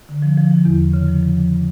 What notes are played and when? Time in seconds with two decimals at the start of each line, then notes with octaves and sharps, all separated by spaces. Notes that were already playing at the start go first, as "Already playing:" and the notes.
0.09 D3
0.22 F3
0.37 F3
0.51 F3
0.65 E2
0.80 E2
0.93 C#3
1.08 F3
1.23 F3
1.37 F3